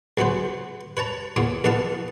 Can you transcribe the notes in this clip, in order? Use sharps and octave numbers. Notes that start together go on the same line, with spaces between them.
C#2 F#3 B3 B4 C5
B4 C#5 A5 A#5
E2 A#2 A#3 B3 C#5
A#1 E2 B3 B4 F5 A5